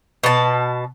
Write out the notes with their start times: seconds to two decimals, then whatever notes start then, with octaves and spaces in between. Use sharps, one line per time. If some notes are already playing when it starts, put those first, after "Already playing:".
0.24 B2 A5